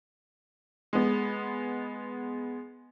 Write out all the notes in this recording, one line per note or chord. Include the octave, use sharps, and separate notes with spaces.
G#3 B3